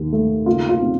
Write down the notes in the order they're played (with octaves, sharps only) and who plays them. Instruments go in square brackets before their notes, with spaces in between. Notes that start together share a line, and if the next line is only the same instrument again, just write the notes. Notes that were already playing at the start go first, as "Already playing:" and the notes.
Already playing: [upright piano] D#2
A3
C#3 F4
F4
C4